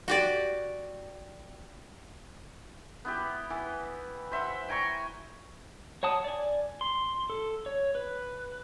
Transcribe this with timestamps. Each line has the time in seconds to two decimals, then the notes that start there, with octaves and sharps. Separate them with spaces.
0.08 F#4 G4 D5
3.05 B3 E4 G4
3.50 E3
4.31 C5 E5 F#5 B5
4.69 G5 G#5 A#5 C#6
6.03 C#5 F#5 A5 D#6
6.24 D5 G#5
6.81 C6
7.30 A4
7.66 C#5
7.95 B4